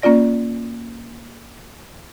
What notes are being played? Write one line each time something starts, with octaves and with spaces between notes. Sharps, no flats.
A#3 C#4 F4 D5 A#6